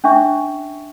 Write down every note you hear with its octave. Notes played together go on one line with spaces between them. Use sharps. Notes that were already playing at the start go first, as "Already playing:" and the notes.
C#4 D4 E5 C#6